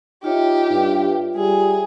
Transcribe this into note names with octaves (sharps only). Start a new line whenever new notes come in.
D#4 F4 G4 C#5 E5
G2
G3 G#4